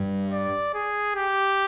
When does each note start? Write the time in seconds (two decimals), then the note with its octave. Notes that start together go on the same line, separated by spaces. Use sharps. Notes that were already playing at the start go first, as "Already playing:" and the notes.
Already playing: G2 G3
0.32 D5
0.74 G#4
1.16 G4